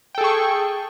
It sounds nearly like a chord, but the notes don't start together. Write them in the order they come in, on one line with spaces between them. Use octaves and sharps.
G5 A4 G#4 C#6